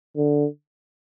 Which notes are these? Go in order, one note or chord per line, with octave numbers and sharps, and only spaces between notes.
D3